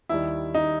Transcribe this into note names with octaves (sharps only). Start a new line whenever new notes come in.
D#2 D#3 G3 E4
D#4